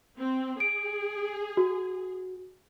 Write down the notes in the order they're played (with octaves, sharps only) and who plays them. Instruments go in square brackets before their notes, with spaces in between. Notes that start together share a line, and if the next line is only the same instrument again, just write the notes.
[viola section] C4
[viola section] G#4 [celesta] D7
[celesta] F#4